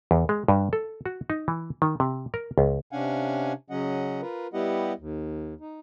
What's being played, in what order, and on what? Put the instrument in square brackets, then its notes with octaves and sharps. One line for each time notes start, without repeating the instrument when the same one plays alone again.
[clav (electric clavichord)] E2
G#3
G2
A4
F#4
D#4
E3
D#3
C3
A#4
C#2
[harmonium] C3 C#4 D4 F5 F#5 G#5
C#3 F#3 C#4 D#5 F#5
F4 A#4 B4
G3 B3 E4 G4 D#5 F#5
D#2
D#4